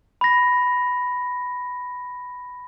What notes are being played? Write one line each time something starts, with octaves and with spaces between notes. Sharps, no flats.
B5 A#6